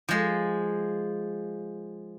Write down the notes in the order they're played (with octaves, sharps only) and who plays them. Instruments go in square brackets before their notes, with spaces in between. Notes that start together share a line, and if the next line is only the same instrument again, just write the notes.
[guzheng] F3 G#3